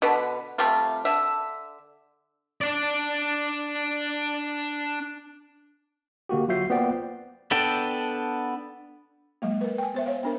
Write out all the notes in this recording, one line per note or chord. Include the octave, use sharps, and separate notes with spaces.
B2 D3 B4
C3 G3 A3 F4
D3 E5
D4 D5
D3 A#3 F#4 G4
F#3 F4 F#4 E5 G6 C7
A#3 B3 F4 C5 D5 G5
B3 D4 A4 G5
F#3 G#3 A#3
A#4 B4
G5 G#5
B3 C5 E5
C5 C#5 F5
B3 D4 A#4